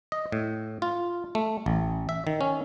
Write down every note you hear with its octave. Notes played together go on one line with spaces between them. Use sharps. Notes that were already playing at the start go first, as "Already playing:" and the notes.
D#5
A2
F4
A3
A1
E5
D#3
C#4